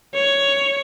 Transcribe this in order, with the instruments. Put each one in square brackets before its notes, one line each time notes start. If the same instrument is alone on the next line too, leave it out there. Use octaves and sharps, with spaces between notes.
[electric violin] C#5